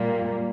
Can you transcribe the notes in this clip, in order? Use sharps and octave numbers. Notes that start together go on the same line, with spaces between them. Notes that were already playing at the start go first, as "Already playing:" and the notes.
Already playing: A#2 G3 A#3